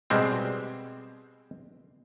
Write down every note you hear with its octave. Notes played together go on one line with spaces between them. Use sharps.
B2 G3 G#3 C4